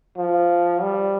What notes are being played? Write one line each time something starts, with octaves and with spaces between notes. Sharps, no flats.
F3
G3